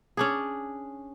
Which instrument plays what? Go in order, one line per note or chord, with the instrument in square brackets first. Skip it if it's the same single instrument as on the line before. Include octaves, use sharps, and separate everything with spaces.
[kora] C#4 D4 G#4